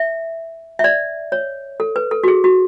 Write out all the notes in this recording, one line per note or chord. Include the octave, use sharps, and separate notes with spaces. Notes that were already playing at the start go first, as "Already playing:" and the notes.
Already playing: E5
E5
D5
C#5
A4
B4
A4
F#4
G#4
F#4